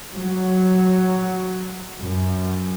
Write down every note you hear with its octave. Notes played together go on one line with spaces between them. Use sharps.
F#3
F#2